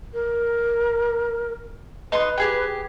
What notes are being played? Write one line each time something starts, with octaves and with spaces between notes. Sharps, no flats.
A#4
D#4 B4 C6 D#6
G4 G#4 G5